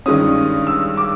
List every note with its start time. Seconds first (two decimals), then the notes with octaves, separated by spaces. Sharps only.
0.06 G2 D#3 G#3 C#4 D#6
0.67 E6
0.97 D6